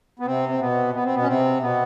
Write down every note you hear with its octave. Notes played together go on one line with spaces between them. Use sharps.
B3
C3 C4
C4
B2 B3
B3
C4
B2 B3
C#4
C3 C4
B2 B3